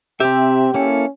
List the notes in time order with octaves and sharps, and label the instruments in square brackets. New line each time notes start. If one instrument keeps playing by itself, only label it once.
[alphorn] C3 [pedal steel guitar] C4 E5 [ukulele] G4 [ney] G5
[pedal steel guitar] A#3 E4 A4 [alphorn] C#4